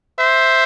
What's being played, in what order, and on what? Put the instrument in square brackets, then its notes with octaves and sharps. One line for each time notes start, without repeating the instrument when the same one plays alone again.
[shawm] C5 [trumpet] E5